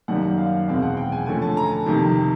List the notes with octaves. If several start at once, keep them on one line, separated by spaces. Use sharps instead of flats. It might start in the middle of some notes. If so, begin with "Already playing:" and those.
F#2 D#3 G3 A#3 F#5
F5
E2 B2 G#3 C4 F5
F#5
G5
G#5
D3 F3 A3 C#4 G#5
A5
A#5
A5
F2 C3 D#3 A5